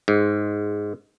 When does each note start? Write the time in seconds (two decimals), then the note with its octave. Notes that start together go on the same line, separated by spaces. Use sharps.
0.08 G#2